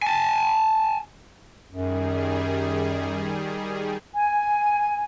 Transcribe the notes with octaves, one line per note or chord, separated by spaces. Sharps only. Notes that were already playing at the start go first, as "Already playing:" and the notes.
G#5 A5
F#2 D#3 G3 G#4
G#5